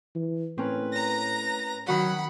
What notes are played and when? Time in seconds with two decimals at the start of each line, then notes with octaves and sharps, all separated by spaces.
0.15 E3
0.58 A2 C4 C#4 A#4 B4
0.92 A#5 A#6
1.87 D#3 F#3 F#4 B4 F#5 B5